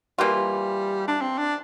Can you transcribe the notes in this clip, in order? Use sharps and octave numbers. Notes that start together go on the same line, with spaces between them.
E3 G3 A#3 F4
D4
C4
D4